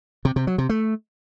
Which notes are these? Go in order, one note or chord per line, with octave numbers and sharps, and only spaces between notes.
C3
C3
F#3
C3
A3